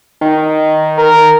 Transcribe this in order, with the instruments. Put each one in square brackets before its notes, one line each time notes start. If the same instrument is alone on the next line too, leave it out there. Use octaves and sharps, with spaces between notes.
[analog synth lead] D#3
[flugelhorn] A#4